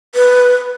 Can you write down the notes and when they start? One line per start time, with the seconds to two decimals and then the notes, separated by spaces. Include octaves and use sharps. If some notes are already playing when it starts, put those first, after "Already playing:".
0.15 B4